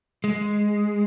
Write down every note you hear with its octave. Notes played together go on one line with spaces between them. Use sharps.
G#3